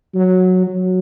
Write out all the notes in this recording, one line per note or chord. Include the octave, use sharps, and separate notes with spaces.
F#3
F#3